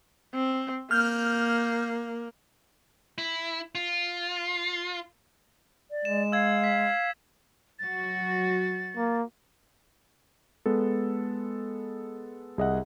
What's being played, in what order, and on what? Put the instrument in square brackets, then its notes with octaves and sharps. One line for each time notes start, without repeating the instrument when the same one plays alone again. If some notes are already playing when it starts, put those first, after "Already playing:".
[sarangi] C4
[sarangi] A#3 [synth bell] F6 G6
[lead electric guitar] E4
F4
[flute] D5
[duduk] G#3 [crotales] E7
[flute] F5 [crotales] E6 G#6
[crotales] B6
[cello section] F#3 F#4 [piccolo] A6
[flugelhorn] A#3
[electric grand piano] G#3 B3 A4
C2 G#4 D#5 E5 F#5